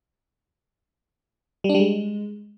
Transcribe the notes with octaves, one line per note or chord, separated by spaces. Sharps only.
G3
D4
G3
G#3